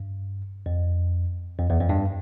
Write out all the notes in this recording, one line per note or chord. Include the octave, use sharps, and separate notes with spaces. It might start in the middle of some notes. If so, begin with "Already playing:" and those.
Already playing: G2
F2
F2
E2
F2
G2